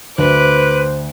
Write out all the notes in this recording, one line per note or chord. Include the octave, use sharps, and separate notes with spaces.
D2 B4 C5 D6 F#6